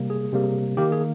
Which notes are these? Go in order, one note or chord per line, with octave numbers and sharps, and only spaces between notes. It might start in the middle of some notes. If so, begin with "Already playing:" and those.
Already playing: C3 G3 A#3
G#4
C3 G3 A#3
D#3 A#3 G4
G#4